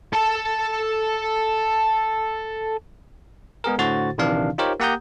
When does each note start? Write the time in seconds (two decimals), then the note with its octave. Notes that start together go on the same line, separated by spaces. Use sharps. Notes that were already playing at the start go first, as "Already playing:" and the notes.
0.13 A4 A5
3.64 G#3 B3 G#4 A#4
3.78 A2 D3 F#4 C5 A6
4.18 A#1 C3 D#3 E3 D4 F5
4.58 D#4 F4 G4 A#4 C5 C#5
4.80 A#3 G4 F#5 A#5 D#6 G6